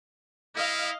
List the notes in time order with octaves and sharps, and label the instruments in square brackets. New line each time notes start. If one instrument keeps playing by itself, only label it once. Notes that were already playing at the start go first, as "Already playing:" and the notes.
[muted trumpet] E4 [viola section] D#5 F5